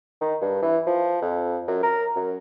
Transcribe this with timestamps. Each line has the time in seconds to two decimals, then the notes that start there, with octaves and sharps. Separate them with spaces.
0.21 D#3
0.41 G2
0.62 E3
0.87 F3
1.22 F2
1.67 F#2
1.82 A#4
2.15 F#2